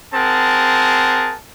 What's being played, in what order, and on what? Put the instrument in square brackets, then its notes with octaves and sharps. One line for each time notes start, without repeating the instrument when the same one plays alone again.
[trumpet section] C4 G#4 A#4 F#5 A5